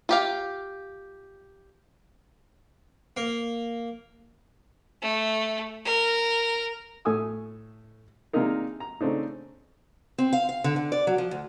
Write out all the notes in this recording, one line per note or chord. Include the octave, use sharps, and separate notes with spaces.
F4 G4 F5
A#3
A3
A#4
A2 A3 A4 G#5 D#6 E6
C3 G#3 A#3 D4 D#4 A#4
A#5
C#3 A3 C4 D4 D#4
C4
F5
F5
D3
D3
D5
F#3
F3
D2